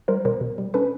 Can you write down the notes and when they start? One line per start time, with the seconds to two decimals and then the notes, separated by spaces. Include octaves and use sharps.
0.08 G3 A#4 C5
0.25 B2 A#4 C5
0.41 B2
0.58 G3
0.74 C#4 A4 B4